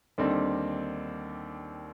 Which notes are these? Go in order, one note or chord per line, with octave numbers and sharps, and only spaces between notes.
D#2 D3 G3 C4 D#4